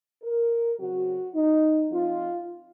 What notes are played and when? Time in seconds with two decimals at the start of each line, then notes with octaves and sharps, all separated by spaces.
0.23 A#4
0.79 C#3 F#3 C4 F#4
1.35 D#4
1.91 F3 C4 D#4 F4